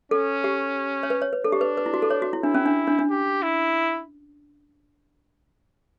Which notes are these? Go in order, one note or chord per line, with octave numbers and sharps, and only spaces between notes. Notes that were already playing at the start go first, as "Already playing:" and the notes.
C#4 A4
G4
C#5
B4
C#5
B4
D4 A4
G4
B4
B4
E4
F#4
A4
C#5
F#4
E4
D4 E4
C#4
D4
D4
D4
G4
E4